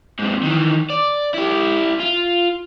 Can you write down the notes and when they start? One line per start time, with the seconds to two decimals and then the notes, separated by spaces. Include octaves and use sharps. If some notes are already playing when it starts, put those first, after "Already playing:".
0.19 G#2 C3
0.43 D#3 E3
0.90 D5
1.34 E4 G4
2.00 F4